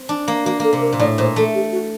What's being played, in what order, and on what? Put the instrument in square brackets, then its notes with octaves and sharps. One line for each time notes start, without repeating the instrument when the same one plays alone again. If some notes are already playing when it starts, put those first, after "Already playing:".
Already playing: [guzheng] C4
D4
A#3
[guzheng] A#3 [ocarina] F#4
[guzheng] A#3 [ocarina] A4
[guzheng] C3
[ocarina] A#4
[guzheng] A#2
[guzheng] A2 [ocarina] D5
[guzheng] A#2 [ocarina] C5
[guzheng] A3 [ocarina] A4
[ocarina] G4
F#4